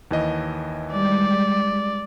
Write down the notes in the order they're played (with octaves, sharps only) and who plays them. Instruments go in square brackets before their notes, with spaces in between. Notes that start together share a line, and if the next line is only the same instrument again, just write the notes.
[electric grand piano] D#2 E3 D#5
[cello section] G3 G#3 [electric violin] D5